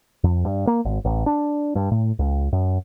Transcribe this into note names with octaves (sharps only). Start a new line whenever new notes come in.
F2
G2
A#3
G#1
A1
D4
G2
A2
C#2
F#2